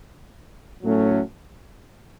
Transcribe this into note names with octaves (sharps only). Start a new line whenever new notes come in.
A2 F#3 A3 C#4